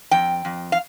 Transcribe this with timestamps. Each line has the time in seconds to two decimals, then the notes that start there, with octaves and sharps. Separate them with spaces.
0.11 F2 G5
0.45 F2
0.72 F5